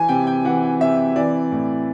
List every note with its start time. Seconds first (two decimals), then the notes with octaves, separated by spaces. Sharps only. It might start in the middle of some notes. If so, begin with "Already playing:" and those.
Already playing: E3 G#5
0.09 C3 G5
0.27 G5
0.45 E3 F#5
0.80 C3 E5
1.16 E3 D5
1.52 A2